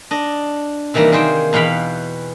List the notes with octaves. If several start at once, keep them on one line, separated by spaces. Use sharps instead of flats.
D4 D#5
C3 D#3 E3 G3 A#3
D#3 G#4 C5 G5
E2 B2 F5 G5 B5